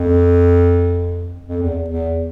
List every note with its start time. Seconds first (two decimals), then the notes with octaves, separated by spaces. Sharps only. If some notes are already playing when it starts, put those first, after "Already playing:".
Already playing: F2
1.49 F2
1.62 E2
1.89 E2